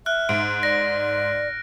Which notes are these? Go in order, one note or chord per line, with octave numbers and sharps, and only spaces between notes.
E5 F6 F#6
G#2 D7
D5 A#6